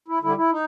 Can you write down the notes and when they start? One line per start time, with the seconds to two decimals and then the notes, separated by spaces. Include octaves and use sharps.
0.08 E4
0.22 D3 G3 E4
0.37 E4
0.52 D#4